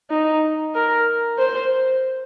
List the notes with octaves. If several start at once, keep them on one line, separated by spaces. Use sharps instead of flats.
D#4
A#4
C5